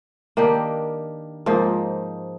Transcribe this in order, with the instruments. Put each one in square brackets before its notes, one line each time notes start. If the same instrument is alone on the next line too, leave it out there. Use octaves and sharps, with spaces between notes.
[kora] D#3 A#3 D4 G4
G#2 F3 A#3 D#4